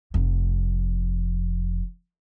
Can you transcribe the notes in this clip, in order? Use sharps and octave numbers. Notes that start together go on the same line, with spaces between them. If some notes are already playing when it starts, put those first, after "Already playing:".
F1 F2